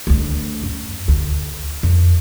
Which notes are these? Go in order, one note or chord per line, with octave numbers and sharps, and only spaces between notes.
D2 A3
F#2
D2
F2